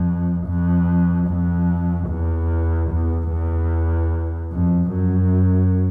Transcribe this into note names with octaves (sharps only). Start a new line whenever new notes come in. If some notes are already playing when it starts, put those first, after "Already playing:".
Already playing: F2
F2
F2
E2
E2
E2
F2
F#2